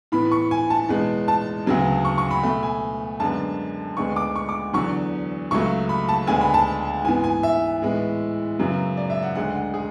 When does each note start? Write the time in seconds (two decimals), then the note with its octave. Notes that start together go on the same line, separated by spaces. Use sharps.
0.12 A2 E3 B3 B5
0.31 C#6
0.51 G#5
0.70 A5
0.89 E2 B2 G#3 B3
1.28 A5
1.66 D2 C#3 F#3 B3
2.05 C#6
2.18 C#6
2.31 B5
2.43 B2 A3 B5
2.63 G#5
3.20 F#2 D3 G#3 B3 A5
3.97 D2 D3 G#3 B3 C#6
4.16 D6
4.36 C#6
4.49 D6
4.73 E2 D3 F#3 C#6
5.51 C#2 C#3 F#3 A3 C#6
5.89 B5
6.09 A5
6.27 D2 D3 G#3 B3 G#5
6.41 B5
6.54 A5
7.05 G#2 E3 B3 G#5
7.24 G#5
7.43 E5
7.82 A2 E3 G#3 B3
8.59 F#2 C#3 F#3 B3
8.97 D5
9.10 E5
9.23 F#5
9.35 D2 D3 G#3 F#5
9.55 F#5
9.74 G#4